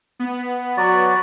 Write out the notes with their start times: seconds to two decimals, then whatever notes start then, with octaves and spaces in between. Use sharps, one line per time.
0.19 B3
0.77 F#3 F#4 D5